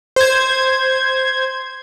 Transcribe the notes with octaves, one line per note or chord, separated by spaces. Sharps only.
C5 G#6